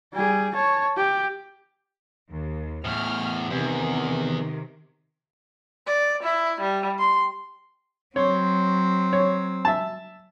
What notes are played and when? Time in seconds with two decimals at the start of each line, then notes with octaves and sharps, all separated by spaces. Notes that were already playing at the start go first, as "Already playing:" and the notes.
0.14 G3 G#4
0.55 C#5 A5
0.97 G4
2.31 D#2
2.85 E2 A2 F6
3.50 E2 C3 D#3
5.87 D5
6.23 E4
6.61 G3
6.99 C6
8.16 F#3 C4 C#5
9.13 C#5
9.65 E5 A5